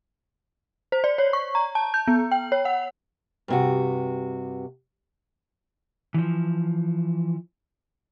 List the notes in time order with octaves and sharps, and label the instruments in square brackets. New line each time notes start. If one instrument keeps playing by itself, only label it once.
[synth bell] C5
D5
C#5
C#6
A#5
A5
G6
B3
G5
C#5
F#5
[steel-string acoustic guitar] G2 C3 F#4
[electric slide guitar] E3 F3